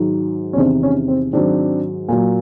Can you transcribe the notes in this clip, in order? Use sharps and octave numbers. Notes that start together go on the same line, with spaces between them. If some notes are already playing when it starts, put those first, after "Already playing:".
Already playing: G#2 D#3 F#3
C#4
E2 C3 D#3 C4 D4
C#4
C4
G#2 D#3 F#3 C4 D4
A#2 F#3